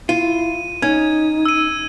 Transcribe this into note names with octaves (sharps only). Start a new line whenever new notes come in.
E4 F4 D#7
C#4 D#4 G#6
E6 D#7